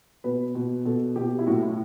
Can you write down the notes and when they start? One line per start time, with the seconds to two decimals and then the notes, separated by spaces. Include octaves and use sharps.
0.24 B2 B4
0.55 B2
0.85 B2 A4
1.16 B2 G4
1.39 E4
1.47 A2 F#4
1.63 E4